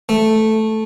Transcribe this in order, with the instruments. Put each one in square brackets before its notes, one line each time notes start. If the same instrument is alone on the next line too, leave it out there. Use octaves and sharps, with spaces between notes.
[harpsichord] A3